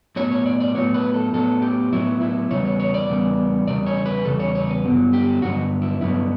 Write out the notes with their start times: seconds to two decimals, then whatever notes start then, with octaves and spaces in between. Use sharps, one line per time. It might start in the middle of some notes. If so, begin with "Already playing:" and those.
0.16 A2 F#3 B3 C#5
0.31 C#5
0.46 D5
0.60 D5
0.75 A2 F#3 B3 C#5
0.94 B4
1.14 A4
1.33 A2 F#3 B3 A4
1.62 G4
1.92 A2 F#3 B3 E4
2.21 E4
2.51 E2 C#3 G3 B3 C#5
2.65 C#5
2.80 C#5
2.94 D5
3.09 E2 C#3 G3 B3
3.67 E2 C#3 G3 D5
3.86 C#5
4.06 B4
4.25 E2 C#3 G3 A4
4.40 C#5
4.55 C#5
4.70 B4
4.84 G2 D3 F#3 B3
5.13 G4
5.42 G2 D3 F#3 B3 F#4
5.82 E4
6.01 G2 D3 F#3 B3 E4